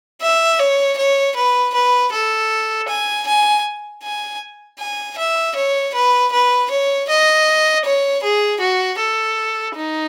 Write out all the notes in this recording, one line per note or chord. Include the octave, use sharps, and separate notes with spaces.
E5
C#5
C#5
B4
B4
A4
G#5
G#5
G#5
G#5
E5
C#5
B4
B4
C#5
D#5
C#5
G#4
F#4
A4
D#4